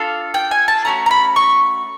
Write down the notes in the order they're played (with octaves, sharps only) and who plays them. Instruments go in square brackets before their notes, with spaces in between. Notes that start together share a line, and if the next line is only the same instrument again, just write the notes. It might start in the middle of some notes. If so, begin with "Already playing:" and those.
Already playing: [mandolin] D4 F4 A4 F5
G5
G#5
A5
A3 C#4 F#4 A#5
A#5
B5
C#6